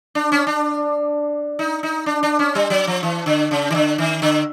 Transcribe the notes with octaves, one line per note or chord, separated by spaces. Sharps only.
D4
C#4
D4
D#4
D#4
D4
D4
C#4
G3
F#3
F3
E3
D3
C#3
D#3
D3
D#3
D3